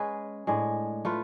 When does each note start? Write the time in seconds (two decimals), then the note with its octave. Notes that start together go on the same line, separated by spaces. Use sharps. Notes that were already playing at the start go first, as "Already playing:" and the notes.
Already playing: G#3 C#4 G#4 B4
0.47 A2 G#3 D4
1.05 A3 F4 B4